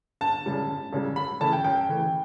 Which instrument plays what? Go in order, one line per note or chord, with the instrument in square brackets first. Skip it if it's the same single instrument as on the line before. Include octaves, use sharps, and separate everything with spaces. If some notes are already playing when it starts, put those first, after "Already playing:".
[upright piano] G1 A5
F#2 C#3 G3
G1
F#2 C#3 G3
F#2 B5
C#3 E3 A3 A5
G5
F#2 G5
C#3 E3 A3